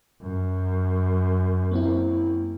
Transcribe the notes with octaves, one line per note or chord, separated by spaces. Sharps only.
F#2
A#3 C4 E4